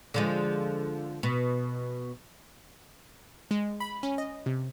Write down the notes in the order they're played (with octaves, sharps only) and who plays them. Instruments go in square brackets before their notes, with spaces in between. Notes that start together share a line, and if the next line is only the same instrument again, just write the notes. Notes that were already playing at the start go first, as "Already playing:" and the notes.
[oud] D3 F3 G#3
B2
[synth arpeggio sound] G#3
B5
C#4
D#5
C3